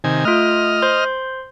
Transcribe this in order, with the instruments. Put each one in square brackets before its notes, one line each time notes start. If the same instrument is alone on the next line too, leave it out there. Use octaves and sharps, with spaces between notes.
[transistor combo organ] C3 D#3 G#5
[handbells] A3 F4 [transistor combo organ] D#5 F6
[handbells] C5 C6